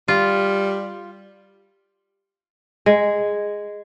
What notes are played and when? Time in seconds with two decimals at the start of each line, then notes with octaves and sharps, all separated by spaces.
0.08 G3 F4
2.86 G#3